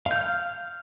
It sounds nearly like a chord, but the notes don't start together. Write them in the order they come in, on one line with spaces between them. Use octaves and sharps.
F5 G6 F6